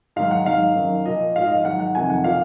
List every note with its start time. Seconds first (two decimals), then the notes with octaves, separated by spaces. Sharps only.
0.16 G#2 D#3 F#3 F5
0.31 F#5
0.46 G#2 D#3 F#3 F5
0.76 F#2 D#3 F#3
1.06 A#2 F3 D#5
1.36 G#2 F3 F5
1.46 D#5
1.55 F5
1.65 G#2 D#3 F#3 F#5
1.80 F#5
1.95 F2 C3 D#3 F#3 G#5
2.10 F#5
2.24 A#2 F3 F5